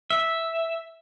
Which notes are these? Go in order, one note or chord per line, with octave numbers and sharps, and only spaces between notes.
E5